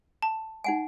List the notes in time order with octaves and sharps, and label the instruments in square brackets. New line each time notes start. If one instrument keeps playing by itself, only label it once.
[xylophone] A5
[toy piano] D#4 F#5 G#5